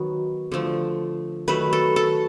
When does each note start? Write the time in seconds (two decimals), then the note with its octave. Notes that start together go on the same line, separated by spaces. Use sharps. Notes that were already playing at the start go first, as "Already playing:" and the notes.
Already playing: D#3 F#3 B3
0.52 D3 F3 A3
1.48 D#3 F#3 A3 B4
1.73 A4
1.96 A4